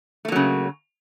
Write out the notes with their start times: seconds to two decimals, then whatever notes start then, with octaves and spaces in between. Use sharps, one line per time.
0.25 A3
0.28 A#3
0.32 F#3
0.36 C#3